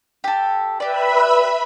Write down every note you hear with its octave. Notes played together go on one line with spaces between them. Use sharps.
G4 A4
G4 B4 D5 E5 B5